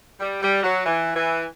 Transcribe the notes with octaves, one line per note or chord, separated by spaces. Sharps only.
G3
G3
F#3
E3
E3